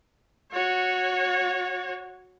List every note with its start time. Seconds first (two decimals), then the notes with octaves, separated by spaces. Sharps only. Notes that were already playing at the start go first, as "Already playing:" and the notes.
0.52 F#4 C#5